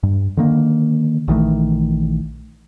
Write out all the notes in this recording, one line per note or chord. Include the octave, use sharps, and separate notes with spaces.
G2
D3 D#3 A#3
A#1 D#3 E3 A3